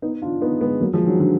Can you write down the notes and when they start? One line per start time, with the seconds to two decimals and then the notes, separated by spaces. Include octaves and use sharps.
0.02 B3 D#4
0.22 D4 F4
0.41 B3 D#4
0.61 G#3 B3
0.80 F#3 A#3
0.93 F3 G#3
1.06 D#3 F#3
1.19 D3 F3